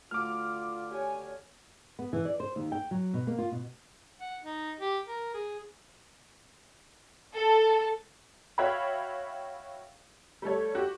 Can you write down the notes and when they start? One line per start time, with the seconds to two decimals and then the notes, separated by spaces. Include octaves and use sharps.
0.11 D2 F4 D6 F6
0.91 G4 C#5 G#5
1.99 B3
2.13 E3
2.25 D5
2.40 C5
2.56 D#2
2.72 G5
2.91 F#3
3.14 B2
3.27 A#3
3.38 F4
3.52 B2
4.21 F#5
4.44 D#4
4.80 G4
5.06 A#4
5.34 G#4
7.35 A4
8.58 F#4 C#5 E5 F5 G5 B5
10.42 G3 A3 A4 C#5
10.75 F#4 G4